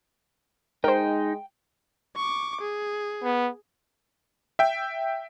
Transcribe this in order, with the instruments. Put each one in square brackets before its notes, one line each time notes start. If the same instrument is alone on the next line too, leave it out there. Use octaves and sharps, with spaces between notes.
[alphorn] G#3 [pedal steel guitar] D#4 [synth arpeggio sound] A#4 C5 [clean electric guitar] G5
[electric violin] C#6 D6
G#4
[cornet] B3
[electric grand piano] E5 G5